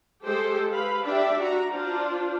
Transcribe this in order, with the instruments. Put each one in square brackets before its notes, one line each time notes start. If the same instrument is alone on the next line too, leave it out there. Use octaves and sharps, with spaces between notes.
[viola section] G#3 G4 A4 C5
B4 F5 B5
D4 G4 D5 E5
F#4 A#5
D4 F4 C5